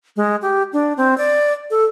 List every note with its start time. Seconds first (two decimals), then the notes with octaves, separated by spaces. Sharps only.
0.16 G#3
0.42 G4
0.73 D4
0.97 C4
1.18 D5
1.71 A4